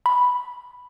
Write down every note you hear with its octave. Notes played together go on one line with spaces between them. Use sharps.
B5